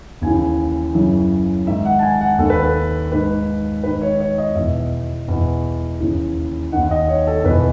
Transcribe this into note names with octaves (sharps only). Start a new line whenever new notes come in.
D#2 C#3 E3 G#5
F#2 C#3 E3
G#2 D#3 E5
F#5
A5
G#5
F#5
D#2 D#3 A4
B4
A4
G#2 D#3 B4
G#2 D#3 B4
C#5
C#5
D#5
E2 B2 E5
E2 B2
D#2 C#3 E3
D#2 D#3 F#5
D#5
C#5
A4
E2 B2 B4